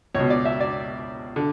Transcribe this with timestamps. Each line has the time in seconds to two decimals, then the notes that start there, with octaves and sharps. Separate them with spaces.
0.15 C#2 B2 C#5
0.30 D5
0.45 E5
0.60 D5
1.36 D3